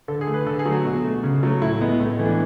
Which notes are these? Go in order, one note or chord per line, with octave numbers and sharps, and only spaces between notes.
D3 A4
G#4
A3
B4
D3 A4
G#4
F#3 A3
F#4
B2
A3
C#3
F#3 A3
A2 E4
G#3 B3
A2 A3
B3
E3 A3
D4